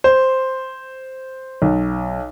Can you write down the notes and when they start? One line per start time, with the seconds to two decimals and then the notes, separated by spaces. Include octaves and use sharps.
0.04 C5
1.62 B1